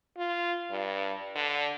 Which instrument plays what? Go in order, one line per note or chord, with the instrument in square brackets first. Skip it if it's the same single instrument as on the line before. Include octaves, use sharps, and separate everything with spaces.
[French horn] F4
G2
D3